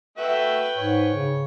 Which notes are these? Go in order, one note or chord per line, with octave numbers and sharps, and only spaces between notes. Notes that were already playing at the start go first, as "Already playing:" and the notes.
A3 F#4 B4 E5 G5
G#2 C#5
C#3